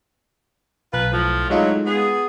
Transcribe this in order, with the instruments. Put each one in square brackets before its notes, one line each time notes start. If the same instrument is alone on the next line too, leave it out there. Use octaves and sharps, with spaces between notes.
[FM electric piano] B1 [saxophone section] F4 B4
[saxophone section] A2 F3
[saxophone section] A2 F#3 [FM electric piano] G#3 D#4 F4
[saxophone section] B3 G#4